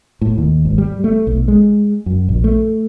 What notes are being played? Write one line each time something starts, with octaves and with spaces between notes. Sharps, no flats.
A2
D#2
G#1
G3
A3
B1
G#3
F#2
A#1
A3